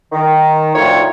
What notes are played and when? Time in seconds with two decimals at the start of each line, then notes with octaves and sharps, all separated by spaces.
0.12 D#3
0.75 D2 A2 D#3 F3 C#5